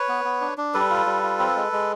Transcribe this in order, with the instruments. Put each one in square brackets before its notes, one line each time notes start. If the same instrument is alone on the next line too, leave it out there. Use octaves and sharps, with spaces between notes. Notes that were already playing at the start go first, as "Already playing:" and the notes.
Already playing: [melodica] B4 C#5
B3
B3
D4
D4
G3 A4 B4
F4
G3
F4
C4
G#3
G#3